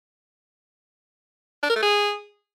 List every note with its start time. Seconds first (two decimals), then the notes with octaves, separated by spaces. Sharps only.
1.63 D4
1.70 A#4
1.76 A3
1.82 G#4